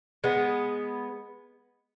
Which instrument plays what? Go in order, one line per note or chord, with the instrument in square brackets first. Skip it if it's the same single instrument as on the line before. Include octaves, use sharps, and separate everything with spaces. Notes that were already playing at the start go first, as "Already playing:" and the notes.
[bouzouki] G#3 B3